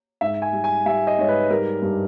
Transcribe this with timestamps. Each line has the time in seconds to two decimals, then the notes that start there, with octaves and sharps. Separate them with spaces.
0.21 G#2 E5
0.42 G#5
0.53 G3
0.64 G#5
0.86 G3 E5
1.07 D#5
1.18 G#2 C#5
1.29 B4
1.50 G3 A#4
1.82 G2